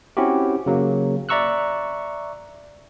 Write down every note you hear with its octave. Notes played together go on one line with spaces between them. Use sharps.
C4 C#4 E4 F#4 G4
C#3 F#3 A#3
D5 E5 A#5 C#6 E6 F#6